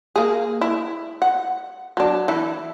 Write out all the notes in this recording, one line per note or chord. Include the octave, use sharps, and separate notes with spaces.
A#3 G#4
E4
F#5
F#3 D4
E3 E4